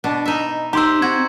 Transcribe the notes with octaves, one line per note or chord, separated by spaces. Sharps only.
B2 D4
D#4 E5
D#4 G4 C5 A#5 C6 E6
C4 F#4 G#6